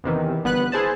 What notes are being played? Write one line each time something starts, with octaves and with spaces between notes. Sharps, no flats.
E2 C3 D#3 E3
G1 B3 B4 F#6
E4 G#4 C5 A5